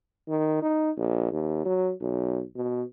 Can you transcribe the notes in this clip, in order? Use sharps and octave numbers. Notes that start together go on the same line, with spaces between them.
D#3
D#4
A#1
D#2
F#3
B1
B2